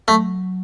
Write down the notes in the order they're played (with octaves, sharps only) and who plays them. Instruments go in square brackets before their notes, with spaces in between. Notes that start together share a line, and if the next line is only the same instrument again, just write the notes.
[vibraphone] F#3 [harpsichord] A3